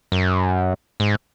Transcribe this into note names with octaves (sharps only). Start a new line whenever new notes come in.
F#2
G#2